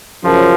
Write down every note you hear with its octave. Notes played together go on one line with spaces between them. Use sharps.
F#2 C#3 F3